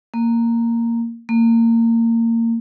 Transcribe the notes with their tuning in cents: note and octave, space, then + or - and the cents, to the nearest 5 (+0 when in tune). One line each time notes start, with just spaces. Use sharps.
A#3 -10
A#3 -25